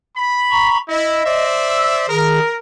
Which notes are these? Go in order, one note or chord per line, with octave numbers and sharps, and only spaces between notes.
B5
A#5 C#6
E4 D#5
C5 D5 E5
E6
D#3 G#4 A#4